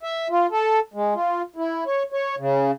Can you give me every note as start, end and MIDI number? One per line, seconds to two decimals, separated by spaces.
0.03 0.28 76
0.30 0.46 65
0.51 0.79 69
0.94 1.14 56
1.15 1.42 65
1.56 1.84 64
1.86 2.03 73
2.12 2.35 73
2.38 2.71 49